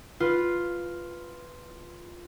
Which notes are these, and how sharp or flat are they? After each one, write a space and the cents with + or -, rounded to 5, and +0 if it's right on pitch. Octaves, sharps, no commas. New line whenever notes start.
F4 +0 B4 +0